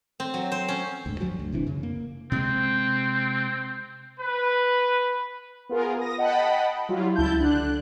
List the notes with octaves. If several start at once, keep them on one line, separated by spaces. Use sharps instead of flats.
C4
F#3
C5
C#4
D2 G#2
G2 F3 F#3
D2
F#1 C3 E3 D4
F#2 C#3
A#3
C3 G#3 C4
B4
B3 F4 G#4 A#4
D#6 A#6
D#5 F#5 G5 A5 B5
F#3 G3 E4 F4
C#2 E4 A5 G6
D3 D4 F#6